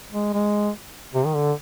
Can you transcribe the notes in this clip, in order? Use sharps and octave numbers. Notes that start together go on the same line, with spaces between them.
G#3
G#3
C3
D#3
D3